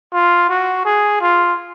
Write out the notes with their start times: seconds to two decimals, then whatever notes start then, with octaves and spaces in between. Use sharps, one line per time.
0.13 F4
0.49 F#4
0.85 G#4
1.21 F4